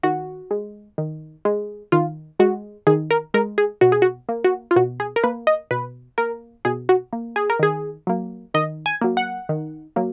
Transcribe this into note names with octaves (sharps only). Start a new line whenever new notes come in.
D#3 F#4
G#3
D#3
G#3
D#3 F4
G#3 F#4
D#3 G#4
A#4
G#3 A#4
G#4
B2 F#4
G#4
F#4
A#3
F#4
F4
B2 F#4
G#4
A#4
A#3 B4
D#5
B2 B4
A#3 A#4
B2 G#4
F#4
A#3
G#4
A#4
D#3 G#4
F#3 A#3
D#3 D#5
G#5
F#3 A#3
F#5
D#3
F#3 A#3